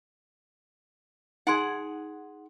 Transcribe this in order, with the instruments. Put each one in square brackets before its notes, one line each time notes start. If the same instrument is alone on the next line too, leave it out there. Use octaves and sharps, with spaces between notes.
[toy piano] D#4 G#5 C6 [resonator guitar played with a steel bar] G#4 F#5